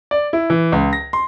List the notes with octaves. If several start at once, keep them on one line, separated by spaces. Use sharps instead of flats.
D5
E4
E3
C#2
A#6
C6